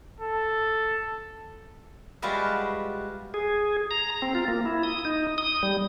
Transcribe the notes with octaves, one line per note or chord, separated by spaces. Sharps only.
A4
G3 G#3 F4 F#4 B4 E5
G#4
A#5
C4
F4
A#3
E4
D#6
D#4
D#6
G3